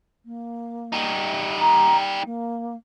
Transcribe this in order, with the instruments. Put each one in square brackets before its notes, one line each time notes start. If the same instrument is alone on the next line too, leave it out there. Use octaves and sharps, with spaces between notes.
[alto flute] A#3
[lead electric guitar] G3 D#4
[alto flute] A#5
G5
A#3